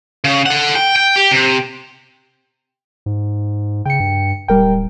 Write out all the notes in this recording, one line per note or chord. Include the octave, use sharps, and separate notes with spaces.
C#3
A4 F#5
G5
G5
G4
C3
G#2
C#3 G5 C#7
G2
D1 G3 A#4 G5